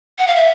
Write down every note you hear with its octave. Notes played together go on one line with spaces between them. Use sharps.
F#5
F5
E5